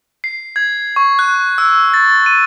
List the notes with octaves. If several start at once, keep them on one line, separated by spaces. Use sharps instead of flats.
C7
G#6
C#6
F#6
E6
A6
D#7